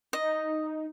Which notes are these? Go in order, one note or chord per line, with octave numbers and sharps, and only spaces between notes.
D#4 D#5